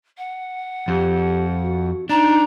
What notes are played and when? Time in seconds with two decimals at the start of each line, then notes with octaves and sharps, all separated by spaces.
0.17 F#5
0.88 F2 G4
1.61 F#4
2.09 D4 D#4 A#5